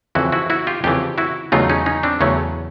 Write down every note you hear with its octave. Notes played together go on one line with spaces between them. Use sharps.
F2 C#3 E3 E4 F#4
E4 F#4
E4 F#4
F4 G4
F2 C#3 E3 F4 G4
E4 F#4
E2 C#3 F#3 A3 D#4 F4
C#4 D#4
C#4 D#4
C4 D4
E2 C#3 F#3 A3 C#4